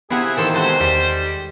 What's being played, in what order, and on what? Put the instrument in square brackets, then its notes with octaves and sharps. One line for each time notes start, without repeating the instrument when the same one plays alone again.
[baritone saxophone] C3 [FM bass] B3 [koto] E4 F5 F#5 [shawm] G#4
[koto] D#3 E3 C5 [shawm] A4
[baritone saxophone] C3 [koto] G#3 F#4 A4 [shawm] C5
[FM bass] E2 [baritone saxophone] G3